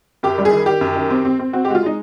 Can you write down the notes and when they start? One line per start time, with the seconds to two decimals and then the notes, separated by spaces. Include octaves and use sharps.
0.23 F#2 G4
0.38 G3
0.45 G#4
0.52 D#3
0.66 D#3 G4
0.81 F#2
0.96 D#3
1.10 C4
1.25 C4
1.39 C4
1.53 C4 F#4
1.65 G4
1.68 G#3 F#4
1.75 F4
1.83 G#3 D#4